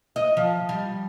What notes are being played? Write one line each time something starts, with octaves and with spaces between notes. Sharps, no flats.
D#5
F3
G3